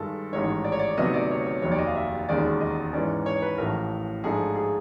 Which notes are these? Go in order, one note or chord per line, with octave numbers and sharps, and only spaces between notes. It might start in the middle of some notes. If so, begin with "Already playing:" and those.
Already playing: G2 D#3 G#3 A4
A1 G#2 D#3 C#5
D5
C#5
D5
D2 C3 D#3 F#3 B3 D#5
D5
C#5
C#5
F1 D#2 D#3 F#3 C#5
D5
D#5
F5
E5
E1 D#2 D#3 G#3 C#4 D5
D#5
G#2 E3 G#3 C#4 D5
C#5
B4
A1 A2 F3 A#4
G#2 F3 A3 D4 G#4
G#4